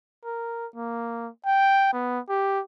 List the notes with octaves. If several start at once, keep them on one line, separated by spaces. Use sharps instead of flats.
A#4
A#3
G5
B3
G4